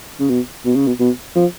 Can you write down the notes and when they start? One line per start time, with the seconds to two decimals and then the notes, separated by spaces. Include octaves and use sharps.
0.20 C#3
0.29 B2
0.65 B2
0.75 C#3
0.87 B2
1.00 B2
1.36 F3